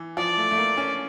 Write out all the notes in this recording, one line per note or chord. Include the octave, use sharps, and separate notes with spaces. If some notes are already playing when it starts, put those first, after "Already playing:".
Already playing: E3
F3 D5
A3
A3
A#3
C#4